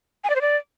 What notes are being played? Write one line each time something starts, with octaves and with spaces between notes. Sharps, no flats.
G#5
D5
C5
D5